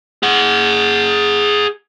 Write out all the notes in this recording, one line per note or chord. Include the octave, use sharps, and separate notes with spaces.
G#4 F#5